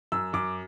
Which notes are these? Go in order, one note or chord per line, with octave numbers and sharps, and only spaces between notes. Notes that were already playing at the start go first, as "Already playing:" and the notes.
F#2 E6
F#2 D6